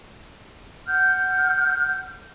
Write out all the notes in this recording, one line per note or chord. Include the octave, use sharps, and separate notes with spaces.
F#5 F6 G6